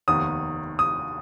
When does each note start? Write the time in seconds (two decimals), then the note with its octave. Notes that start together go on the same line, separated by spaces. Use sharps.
0.08 F1 D#2 D#3 B3 D#6
0.79 D#6